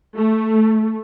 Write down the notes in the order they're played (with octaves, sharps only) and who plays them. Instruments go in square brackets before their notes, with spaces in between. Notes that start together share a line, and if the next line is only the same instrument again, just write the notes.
[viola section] A3